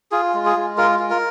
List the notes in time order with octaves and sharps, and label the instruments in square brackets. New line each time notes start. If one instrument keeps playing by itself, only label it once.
[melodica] F4 G#4
G#3
G#4
G#3
F4 A#4
F4
A#4